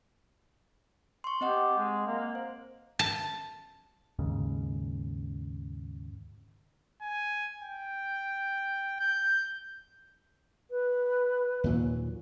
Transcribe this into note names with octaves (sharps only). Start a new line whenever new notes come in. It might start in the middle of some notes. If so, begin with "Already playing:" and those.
C6 C#6
C4 G4 D#5 F#5
G#3
A#3
C5
A5
D#2 G#2 C#3
G#5
G5
G6
B4
D#2 A#2 F#3